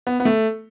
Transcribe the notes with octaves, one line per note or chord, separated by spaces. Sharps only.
B3
B3
A3